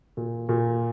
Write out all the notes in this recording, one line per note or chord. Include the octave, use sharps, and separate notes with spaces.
A#2
A#2